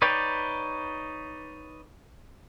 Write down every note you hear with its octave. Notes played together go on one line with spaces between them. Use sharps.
D#4 B4 C#5 D5 G5